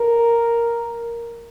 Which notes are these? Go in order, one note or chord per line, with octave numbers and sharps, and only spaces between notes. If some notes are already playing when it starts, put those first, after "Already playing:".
Already playing: A#4